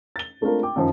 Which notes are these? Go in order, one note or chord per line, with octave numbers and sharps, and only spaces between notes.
A6 G7
G#3 A3 C4 D4 F4 A#4
G5 D6
F#2 D#3 F3